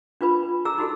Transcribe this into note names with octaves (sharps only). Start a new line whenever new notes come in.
D4 F4 B4 B5
G#4 A#5 E6
D#4 F#4 G#4 A4